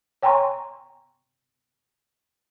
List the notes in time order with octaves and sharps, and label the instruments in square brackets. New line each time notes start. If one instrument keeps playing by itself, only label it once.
[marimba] C#5 G5 G#5 A#5 C6 C#6